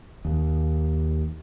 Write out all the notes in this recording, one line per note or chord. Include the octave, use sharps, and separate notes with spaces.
D#2